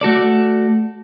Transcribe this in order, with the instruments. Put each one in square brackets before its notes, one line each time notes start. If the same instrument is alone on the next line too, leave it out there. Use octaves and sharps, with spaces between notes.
[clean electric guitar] A3 F#4 A4 D5